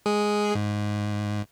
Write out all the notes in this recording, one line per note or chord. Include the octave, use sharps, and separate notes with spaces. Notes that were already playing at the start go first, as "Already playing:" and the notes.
G#3 G#4
G#2